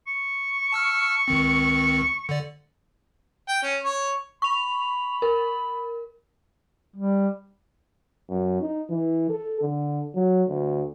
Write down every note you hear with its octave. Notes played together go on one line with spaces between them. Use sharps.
C#6
A5 E6 F6
C#2 D#3 C4
D3 D5
G5
C#4
C#5
B5 C#6 F7
A#4
G3
F#2
D#4
E3
A4
D3
F#3
D2